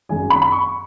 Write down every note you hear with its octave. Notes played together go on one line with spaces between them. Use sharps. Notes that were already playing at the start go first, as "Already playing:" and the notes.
G#1 F#2 D#3 G#3 G#5
B5
B5
C#6